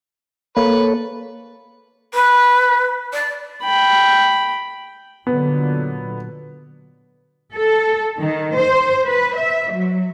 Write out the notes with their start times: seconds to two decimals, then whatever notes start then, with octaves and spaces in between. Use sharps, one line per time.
0.57 A#3 A4 B4 C#5
2.13 B4
3.13 D5
3.63 G5 B5
5.27 A#2 D3 F#3 B3
7.54 A4
8.20 D#3
8.58 C5
9.06 B4
9.36 E5
9.72 F#3